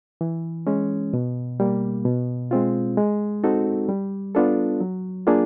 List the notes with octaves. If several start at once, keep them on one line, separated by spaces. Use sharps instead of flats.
E3
G#3 C#4
B2
G3 A#3
B2
G#3 C4 F4
G#3
C4 D#4 F#4 A4
G3
B3 D4 F4 A4
F#3
A#3 D4 F4 G#4